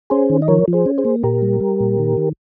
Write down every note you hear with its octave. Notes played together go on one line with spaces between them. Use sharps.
C#4 G#4 C5
D#3
D#5
F3 A#4 C#5
F3
G#4 C5
C#4
G#4 C5
A#3
A#2 G4 A#4
G3
G3
A#2
D#3
D#3